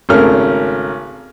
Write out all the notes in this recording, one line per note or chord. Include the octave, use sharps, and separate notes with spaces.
G#1 C#3 A3 A#4 F6